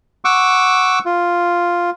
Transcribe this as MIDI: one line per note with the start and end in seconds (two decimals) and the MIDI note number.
0.25 0.99 78
0.25 0.99 85
0.25 0.99 86
0.25 0.99 88
1.05 1.90 65